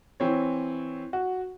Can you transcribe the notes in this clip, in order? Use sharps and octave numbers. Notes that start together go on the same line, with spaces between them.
E3 C4 C#5
F#4